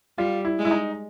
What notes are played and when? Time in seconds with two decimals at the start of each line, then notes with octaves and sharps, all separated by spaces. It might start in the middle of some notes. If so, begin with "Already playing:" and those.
0.18 G3 F4
0.45 E4
0.59 G#3
0.65 E4
0.71 D#4